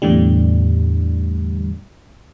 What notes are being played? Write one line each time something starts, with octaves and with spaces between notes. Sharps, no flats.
E2 A2 D3 G3